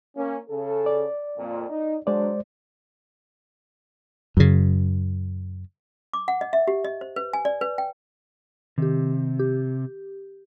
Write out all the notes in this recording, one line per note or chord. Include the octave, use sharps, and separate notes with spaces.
A#3 C#4
C#3 A4
D5
F2 A#2
D#4
F#3 G#3 D4 C5 D5
F#2 C#3
D6
F#5
D#5
E5
G4
D#5
C5
B4
G#5
D5
B4
G5
C3 D#3 G4
G4